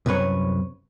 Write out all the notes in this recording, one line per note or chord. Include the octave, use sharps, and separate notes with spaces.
C2 F#2 B4 C#5